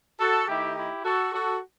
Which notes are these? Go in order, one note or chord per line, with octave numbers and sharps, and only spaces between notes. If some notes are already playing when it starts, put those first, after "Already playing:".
F#4 A4
D#3 A3 D#4 E4 G4
E4 G4
F#4 A4
F#4 A4